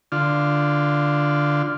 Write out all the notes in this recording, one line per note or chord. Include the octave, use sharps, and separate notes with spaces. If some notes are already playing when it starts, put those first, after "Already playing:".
D3 F4